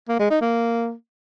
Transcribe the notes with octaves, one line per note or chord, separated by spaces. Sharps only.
A#3
G#3
D#4
A#3